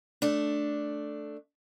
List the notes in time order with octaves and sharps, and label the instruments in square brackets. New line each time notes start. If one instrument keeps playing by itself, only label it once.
[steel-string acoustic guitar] A3 D4